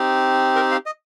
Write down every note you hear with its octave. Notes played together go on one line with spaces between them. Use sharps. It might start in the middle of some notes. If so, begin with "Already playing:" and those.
Already playing: C4 D#4 G4
A#4
F5
D#5